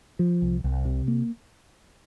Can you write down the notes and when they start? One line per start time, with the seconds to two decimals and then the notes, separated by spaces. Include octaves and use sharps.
0.19 F3
0.42 C2
0.64 C2
0.85 C3
1.08 A#3